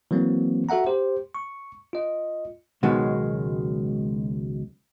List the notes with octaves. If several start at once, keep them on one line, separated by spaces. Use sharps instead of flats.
E3 F#3 A#3 C4
F#4 A4 E5 F#5 A#5
G4 C5
C#6
F4 D#5
C#2 B2 D#3 F#3 G#3